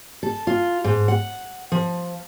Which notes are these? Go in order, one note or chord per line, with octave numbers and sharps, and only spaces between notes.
A4
F4
G#2
F#5
F3